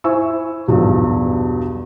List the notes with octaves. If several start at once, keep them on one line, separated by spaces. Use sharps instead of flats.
E4 C5 E5 G#5 C#6 E6
B1 E2 G2 B2 F3 F#3